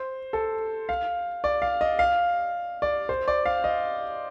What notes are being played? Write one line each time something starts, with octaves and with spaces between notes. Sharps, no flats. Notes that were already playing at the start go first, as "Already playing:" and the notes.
Already playing: C5
A4
F5
D5
F5
D#5
F5
D5
C5
D5
F5
D#5